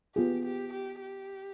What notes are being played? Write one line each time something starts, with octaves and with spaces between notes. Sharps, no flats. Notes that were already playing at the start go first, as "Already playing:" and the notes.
B3 F4 G4 G#4
G4
G4
G4